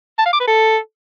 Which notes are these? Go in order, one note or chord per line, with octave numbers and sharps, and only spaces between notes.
A5
F5
D6
B4
A4